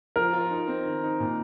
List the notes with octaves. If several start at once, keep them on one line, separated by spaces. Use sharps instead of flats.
F3 A#4
F4
D#4
C4
D#3
D#4
A#2